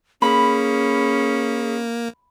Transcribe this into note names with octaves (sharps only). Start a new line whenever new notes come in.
A#3 C#4 G#4 B5